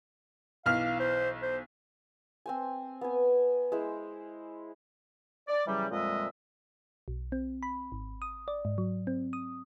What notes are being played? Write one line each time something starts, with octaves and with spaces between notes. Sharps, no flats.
B1 E3 F5 F6
C5
C5
C4 C5 G#5
B3 G#5
G#3 E4 C5 E6
D5
C#3 E3 F#3 G3
F2 A#2 G3 G#3 D#5 E5
B1
C4
B5
G#1
D#6
D5
G#2
F#3
C4
D#6